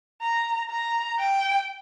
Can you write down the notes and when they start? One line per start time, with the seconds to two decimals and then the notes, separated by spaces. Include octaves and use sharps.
0.22 A#5
0.71 A#5
1.19 G5